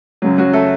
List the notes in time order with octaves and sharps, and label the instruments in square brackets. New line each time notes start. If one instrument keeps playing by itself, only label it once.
[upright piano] F#2 C#3 F#3
F#3 F#4
A3 A4